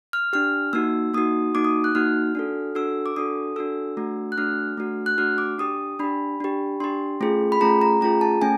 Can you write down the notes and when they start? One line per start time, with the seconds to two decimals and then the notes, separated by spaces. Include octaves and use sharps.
0.13 F6
0.33 D4 G4 F6
0.73 A#3 D#4 F#4 E6
1.14 A#3 D#4 F#4 D#6
1.55 A#3 D#4 F#4 D6
1.65 D#6
1.84 F#6
1.95 A#3 D#4 F#4 F6
2.35 D4 F#4 A4
2.75 D4 F#4 A4 E6
3.06 D6
3.16 D4 F#4 A4 D#6
3.56 D4 F#4 A4 E6
3.97 A3 D4 F#4
4.32 F#6
4.37 A3 D4 F#4 F6
4.78 A3 D4 F#4
5.06 F#6
5.18 A3 D4 F#4 F6
5.38 D6
5.58 D4 G4 D#6
5.99 D4 G4 B5
6.40 D4 G4
6.80 D4 G4 C6
7.21 A3 C#4 F4 G#4
7.52 B5
7.61 A3 C#4 F4 G#4 A#5
7.81 A#5
8.01 A3 C#4 F4 G#4 A#5
8.21 A5
8.41 A3 C#4 G#5